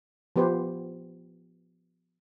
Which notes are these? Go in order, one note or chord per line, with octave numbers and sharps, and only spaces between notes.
F3 B3 G4 B4 C5